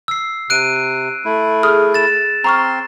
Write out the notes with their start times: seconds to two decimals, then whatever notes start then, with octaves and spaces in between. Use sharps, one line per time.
0.08 E6 C7
0.50 C3 F#6 D7 D#7
1.25 A3 E4
1.63 G#4 D#6 F6
1.94 A6 E7
2.44 C4 A#5 C6 C#6 F6